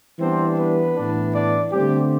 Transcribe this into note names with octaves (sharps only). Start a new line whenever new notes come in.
E3 G3 B3 C4 D4 C5
B3 B4
A2 E3 B3 D4
D4 D5
D3 G3 A3 C4 G4